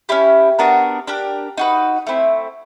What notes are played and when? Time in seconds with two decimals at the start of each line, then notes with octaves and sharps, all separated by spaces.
0.09 C#4 E4 G4
0.59 B3 D4 F#4 A#4
1.07 D4 G4 A#4
1.57 D#4 F#4 B4
2.07 A3 C4 E4